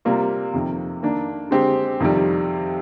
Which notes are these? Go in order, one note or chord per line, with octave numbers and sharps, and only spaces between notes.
C3 G3 A#3 F4
F2 C3 D#3
D#3 A#3 D4
D3 G#3 C4 G4
F2 C3 D#3 G3